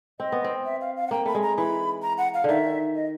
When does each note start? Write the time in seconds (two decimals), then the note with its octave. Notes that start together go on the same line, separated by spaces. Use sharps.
0.20 C4 D#5
0.32 B3
0.44 C4
0.65 E5
0.81 F5
0.97 F5
1.07 F#5
1.11 A#3 G5
1.26 A3 B5
1.35 G#3
1.43 A#5
1.58 E3 B5
2.03 A#5
2.18 F#5
2.34 F5
2.44 D3 D#3 E5
2.95 D#5